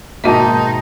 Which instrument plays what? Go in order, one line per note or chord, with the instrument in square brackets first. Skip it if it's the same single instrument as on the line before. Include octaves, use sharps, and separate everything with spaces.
[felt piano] G#2 B2 D#3 [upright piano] A#3 A5 [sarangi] D#4 [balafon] F#4 E5